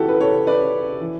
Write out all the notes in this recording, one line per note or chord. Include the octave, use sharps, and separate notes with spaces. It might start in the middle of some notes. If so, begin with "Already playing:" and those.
Already playing: E3 E4 F#4 G4 A4
B4
A4 C#5
B4 D5
E3